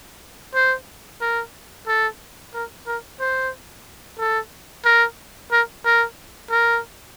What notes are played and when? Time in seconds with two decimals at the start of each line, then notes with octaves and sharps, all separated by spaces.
0.55 C5
1.22 A#4
1.87 A4
2.54 A#4
2.87 A#4
3.20 C5
4.19 A4
4.85 A#4
5.52 A#4
5.85 A#4
6.51 A#4